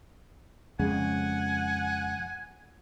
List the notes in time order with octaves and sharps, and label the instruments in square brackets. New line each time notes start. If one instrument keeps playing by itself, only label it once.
[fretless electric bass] F2 C#3 G#3 [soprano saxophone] F#5 [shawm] G#5